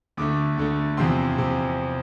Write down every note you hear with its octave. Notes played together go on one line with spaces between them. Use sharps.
D2 D3 A3 D6
D2 D3 A3
E2 C3 F3 C4 C6
C3